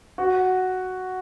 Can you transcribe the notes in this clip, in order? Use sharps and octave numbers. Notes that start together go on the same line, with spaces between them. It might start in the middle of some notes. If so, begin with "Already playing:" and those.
F#4